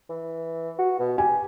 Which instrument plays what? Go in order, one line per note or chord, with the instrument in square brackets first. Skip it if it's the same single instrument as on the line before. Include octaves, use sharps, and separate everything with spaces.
[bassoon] E3
F#4
B2
[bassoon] G4 [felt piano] G#5